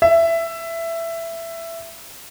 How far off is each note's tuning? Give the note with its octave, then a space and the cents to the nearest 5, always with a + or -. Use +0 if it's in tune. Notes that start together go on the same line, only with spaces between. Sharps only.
E5 +15